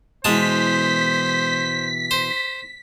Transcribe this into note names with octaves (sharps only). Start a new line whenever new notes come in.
B2 E3 G#3 C5 A5 B6
C5